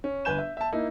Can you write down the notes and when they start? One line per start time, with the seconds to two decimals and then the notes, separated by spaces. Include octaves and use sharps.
0.04 C#4
0.25 G1 B4 G#5 G6 E7
0.38 E5
0.57 E5 A5
0.73 A#3 D#4 E4